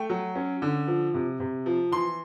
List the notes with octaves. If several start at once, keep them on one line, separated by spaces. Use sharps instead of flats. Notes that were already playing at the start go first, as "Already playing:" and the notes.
Already playing: A3 G5
F#3
C#4
D3
F3
C3
C3
F3
E3 C6